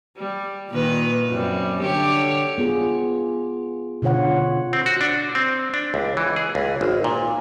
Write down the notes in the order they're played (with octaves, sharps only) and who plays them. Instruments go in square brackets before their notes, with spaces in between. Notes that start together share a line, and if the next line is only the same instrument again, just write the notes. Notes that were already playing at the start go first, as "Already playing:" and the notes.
[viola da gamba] G3
A#2 D#3 B4
F#2 C3 G3
D3 G4 C#5
[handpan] B3 F4 G#4
B2 D3 F4 C#5 F#5
[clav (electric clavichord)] C4
F#4
D4
C4
D4
C#2
E3
G#4
C#2
G#1
A#2